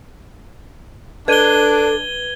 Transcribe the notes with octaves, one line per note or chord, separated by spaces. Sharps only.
D4 A4 B4 G#6 D#7 G7